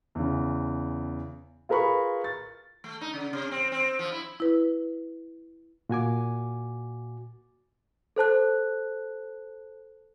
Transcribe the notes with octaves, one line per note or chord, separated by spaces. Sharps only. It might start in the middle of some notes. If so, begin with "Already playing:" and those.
E2 C#3
F4 G#4 A#4 B4 B5 C#6
A6
A3
D#4
C#3
C3
C4
C4
F3
E4
E4 B4
A#2 F#4 G#5 D6
A4 C5 A5 F#6